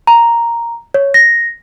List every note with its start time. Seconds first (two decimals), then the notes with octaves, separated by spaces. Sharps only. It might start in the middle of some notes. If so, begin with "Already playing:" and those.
0.07 A#5
0.94 C#5
1.14 A#6